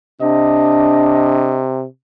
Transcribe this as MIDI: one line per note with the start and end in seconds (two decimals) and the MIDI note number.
0.21 1.85 48
0.21 1.60 62
0.21 1.68 75